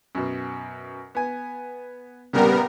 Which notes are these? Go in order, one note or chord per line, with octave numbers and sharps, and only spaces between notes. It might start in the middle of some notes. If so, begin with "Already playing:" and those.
F#2 B2
B3 G#5
A#1 C#3 G3 B3 A#4